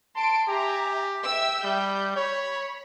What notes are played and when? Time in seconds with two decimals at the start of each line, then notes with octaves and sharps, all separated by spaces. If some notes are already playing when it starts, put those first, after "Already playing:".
0.16 A5 C6 D7
0.48 G4 E5 G#5 A#5
1.25 E5 G5 E6
1.64 G3 G6
2.16 C#5 B5